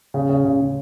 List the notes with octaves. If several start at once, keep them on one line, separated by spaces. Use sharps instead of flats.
C#3
C#3
C#3
C#3